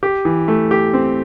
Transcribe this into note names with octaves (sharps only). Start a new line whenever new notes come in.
G4
E3
A3
G4
C4